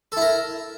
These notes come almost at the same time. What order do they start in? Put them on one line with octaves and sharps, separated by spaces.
A4 E4 A#4